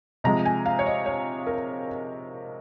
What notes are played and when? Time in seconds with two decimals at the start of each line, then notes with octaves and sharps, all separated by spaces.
0.24 C3 F3 G#3 A#5
0.45 G#5
0.66 F5
0.79 C#5
0.86 D#5
1.06 C#5
1.47 A#4